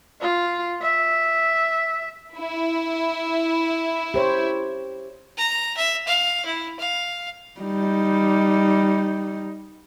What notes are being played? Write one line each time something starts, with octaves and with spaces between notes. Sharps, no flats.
F4
E5
E4
G4 C5 C#5
A#5
E5
F5
E4
F5
G3 D#4